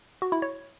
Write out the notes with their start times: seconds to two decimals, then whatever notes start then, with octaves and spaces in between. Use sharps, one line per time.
0.22 F#4
0.32 E4
0.42 C#5